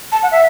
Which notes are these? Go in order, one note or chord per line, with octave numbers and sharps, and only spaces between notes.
A5
F#5
E5